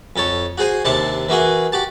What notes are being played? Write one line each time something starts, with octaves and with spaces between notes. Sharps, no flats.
F2 A4 C#5
F#4 G#4 C5 G#5
D#2 C3 D4 A5 C6
E3 A#3 F#4 G#4
F#4 G4 A5